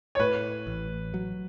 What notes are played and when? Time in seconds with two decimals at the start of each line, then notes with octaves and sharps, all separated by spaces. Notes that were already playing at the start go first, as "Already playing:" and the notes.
0.15 C#5
0.19 A2 B4
0.67 A1
1.14 F#3